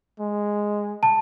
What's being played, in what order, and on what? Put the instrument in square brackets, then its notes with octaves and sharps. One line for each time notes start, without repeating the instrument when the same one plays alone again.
[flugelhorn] G#3
[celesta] A5